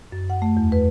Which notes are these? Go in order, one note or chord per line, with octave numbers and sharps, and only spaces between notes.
F#2
F#5
A3
E2
B4